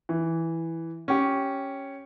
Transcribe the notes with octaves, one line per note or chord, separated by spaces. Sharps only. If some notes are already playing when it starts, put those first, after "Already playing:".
E3
C#4 G4